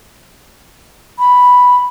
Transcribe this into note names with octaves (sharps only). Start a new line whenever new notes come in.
B5